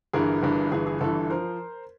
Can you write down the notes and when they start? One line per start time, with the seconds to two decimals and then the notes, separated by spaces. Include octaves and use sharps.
0.13 G1 G2 E3 G#4 A#4
0.43 G1 G2 E3
0.71 G1 G2 E3 G#4
0.87 G#4
1.01 G1 G2 E3 A4
1.30 F3 A#4 C5